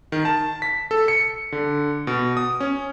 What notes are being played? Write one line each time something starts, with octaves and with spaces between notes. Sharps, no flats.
D#3
A5
B6
A4
C#7
D3
B2
D#6
C#4